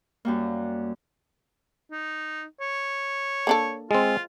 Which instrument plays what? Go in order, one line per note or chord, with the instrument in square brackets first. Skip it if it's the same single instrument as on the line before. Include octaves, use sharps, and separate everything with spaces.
[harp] F#2 G3 A#3
[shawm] D#4
C#5
[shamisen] A#3 D4 A4
[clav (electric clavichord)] G#3 C4 [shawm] F4